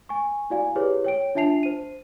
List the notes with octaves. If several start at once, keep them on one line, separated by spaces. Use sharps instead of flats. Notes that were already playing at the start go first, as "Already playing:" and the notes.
G#5 C#6
E4 F#4 D5 F5 G#5
E4 G4 G#4 B4 C#5
C#5 G5 D7
D4 F4 E5 A5 C7 F7
C5 D#7